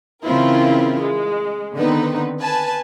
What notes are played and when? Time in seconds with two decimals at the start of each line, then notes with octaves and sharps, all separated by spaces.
0.24 C#3 E3 C4 E4 F4 A#4
1.01 G#3
1.76 D3 D#3 B3 C4 D#4 B4
2.41 B4 G#5 A5